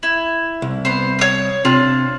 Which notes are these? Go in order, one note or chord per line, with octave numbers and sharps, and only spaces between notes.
E4
C2
B3 C5
C#5 D#6
C3 D4 F4